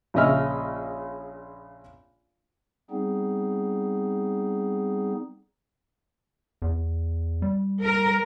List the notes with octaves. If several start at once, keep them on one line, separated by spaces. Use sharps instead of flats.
A#1 C#3 C#4 D#5 E5 F6
G3 B3 C4 D#4 G#4
E2
G3
A#4